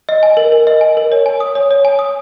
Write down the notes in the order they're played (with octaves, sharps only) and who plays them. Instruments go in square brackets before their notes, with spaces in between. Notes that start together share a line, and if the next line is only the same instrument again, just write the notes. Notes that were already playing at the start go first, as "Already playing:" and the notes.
[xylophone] D#5
G#5
A#4
A#4
D#5
G#5
A#4
C#5
G#5
D#6
C#5
C#5
G#5
D#6